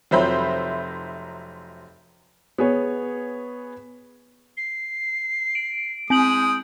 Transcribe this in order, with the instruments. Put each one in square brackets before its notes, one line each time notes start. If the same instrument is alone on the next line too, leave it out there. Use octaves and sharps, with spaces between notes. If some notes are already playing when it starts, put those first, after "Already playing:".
[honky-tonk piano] F1 F#3 C5 E5 B5 G6
[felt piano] B3 G#4 C#5
[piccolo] C7
[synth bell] D7
[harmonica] G#3 D#6 [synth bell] C4 G6 F#7 [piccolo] D7